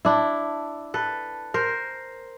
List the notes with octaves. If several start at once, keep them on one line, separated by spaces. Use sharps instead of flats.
D4 E4
A4 B4
A#4 C5